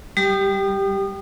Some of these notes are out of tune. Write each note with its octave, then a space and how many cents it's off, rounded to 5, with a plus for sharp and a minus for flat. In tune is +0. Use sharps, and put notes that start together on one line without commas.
G3 -5 G4 +0 D#6 -35